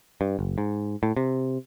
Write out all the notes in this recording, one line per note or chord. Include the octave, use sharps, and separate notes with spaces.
G2
F#1
G#2
A2
C3